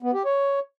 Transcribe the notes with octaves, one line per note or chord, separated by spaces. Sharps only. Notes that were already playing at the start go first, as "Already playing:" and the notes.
B3
G4
C#5